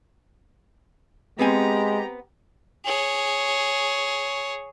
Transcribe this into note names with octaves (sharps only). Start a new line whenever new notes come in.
G#3 B3 C4 G4 G#5 A#5
G#4 C#5